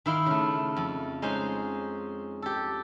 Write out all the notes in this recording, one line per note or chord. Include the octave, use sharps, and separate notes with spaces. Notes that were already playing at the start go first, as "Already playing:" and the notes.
D#3 E4 F5 C6
C#3 A3
F2
G#3 C#4 D#4 C5
G4 A4